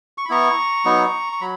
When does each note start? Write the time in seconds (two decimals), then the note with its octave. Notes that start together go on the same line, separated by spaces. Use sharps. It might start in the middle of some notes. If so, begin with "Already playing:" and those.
0.18 C#6
0.25 B5
0.29 B3 E4 A#5 C#6
0.85 F#3 B3 D#4
1.32 C#6
1.41 F#3 B5